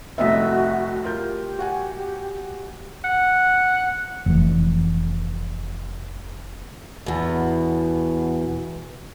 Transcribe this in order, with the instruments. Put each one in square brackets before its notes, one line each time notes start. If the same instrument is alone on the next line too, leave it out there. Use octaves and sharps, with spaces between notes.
[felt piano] F1 C2 [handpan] A3 D#5 E5 [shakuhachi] F#4
[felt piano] F4 A#4 G6 [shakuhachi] G4
[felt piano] F#4 F#5 G#5
[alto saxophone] F#5
[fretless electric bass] F1 E3
[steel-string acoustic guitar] E2 B2